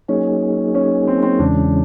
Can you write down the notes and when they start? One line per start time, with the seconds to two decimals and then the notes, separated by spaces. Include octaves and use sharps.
0.08 F#3 A#3 C#4 D#4 G#4
0.75 C#4
1.07 C4
1.23 C4
1.40 E2 C#3 E3 G#3 C#4 D4